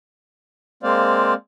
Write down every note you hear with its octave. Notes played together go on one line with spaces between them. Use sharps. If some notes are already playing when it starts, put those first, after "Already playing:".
G#3 A#3 C4 C5 D5 F5